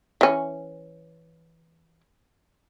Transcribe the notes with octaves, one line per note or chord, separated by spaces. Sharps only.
E3 C#4